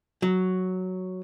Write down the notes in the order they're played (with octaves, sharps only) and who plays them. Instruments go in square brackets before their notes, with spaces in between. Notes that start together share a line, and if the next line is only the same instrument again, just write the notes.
[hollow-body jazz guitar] F#3